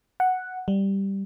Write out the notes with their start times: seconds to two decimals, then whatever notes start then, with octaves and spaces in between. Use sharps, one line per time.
0.20 F#5
0.68 G3